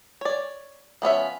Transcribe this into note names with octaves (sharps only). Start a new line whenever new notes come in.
C#5 D5
F3 B3 C#4 E5